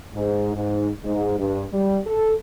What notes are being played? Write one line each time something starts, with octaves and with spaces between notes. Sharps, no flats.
G#2
G#2
G#2
G2
G3
A4